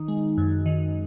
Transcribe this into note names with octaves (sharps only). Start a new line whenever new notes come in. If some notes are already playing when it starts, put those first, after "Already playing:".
Already playing: D#3 D#4
G#3
F#2
D#3